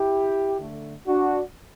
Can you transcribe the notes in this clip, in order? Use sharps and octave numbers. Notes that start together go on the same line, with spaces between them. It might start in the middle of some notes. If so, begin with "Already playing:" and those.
Already playing: E4 G4
D3 A3
D4 F#4